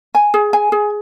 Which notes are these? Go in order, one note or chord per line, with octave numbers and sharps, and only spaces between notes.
G#5
G#4
G#5
G#4